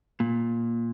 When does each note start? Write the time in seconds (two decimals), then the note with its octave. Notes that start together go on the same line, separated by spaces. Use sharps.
0.20 A#2